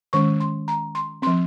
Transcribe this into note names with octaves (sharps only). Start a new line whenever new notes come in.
D#3 G#3 C#4 C#6
C6
A#5
C6
F3 C4 C6